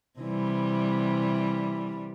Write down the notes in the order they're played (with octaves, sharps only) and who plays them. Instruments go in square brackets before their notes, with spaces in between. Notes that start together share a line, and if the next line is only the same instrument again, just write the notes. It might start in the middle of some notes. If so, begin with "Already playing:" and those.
[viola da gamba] C3 E3 G3